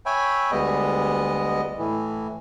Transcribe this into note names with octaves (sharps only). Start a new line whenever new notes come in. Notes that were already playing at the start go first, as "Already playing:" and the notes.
C#5 E5 G5 G#5 B5
D2 G3 G#3 B3 D#5
A2 E3